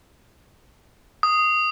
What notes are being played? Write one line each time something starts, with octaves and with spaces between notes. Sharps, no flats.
D#6